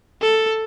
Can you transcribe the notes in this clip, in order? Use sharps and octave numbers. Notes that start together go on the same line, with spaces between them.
A4